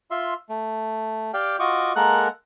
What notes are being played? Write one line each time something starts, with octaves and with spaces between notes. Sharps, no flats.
F4 E5 C6
A3
G4 D5 F5 G5
F4 F#4 D#5 C#6 D6
G#3 A#3 A4 A#4 F#5 F#6